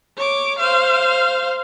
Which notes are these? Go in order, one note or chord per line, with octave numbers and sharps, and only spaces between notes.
C#5 D6
C5 F5